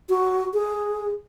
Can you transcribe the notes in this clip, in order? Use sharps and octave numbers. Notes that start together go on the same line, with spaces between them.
F#4
G#4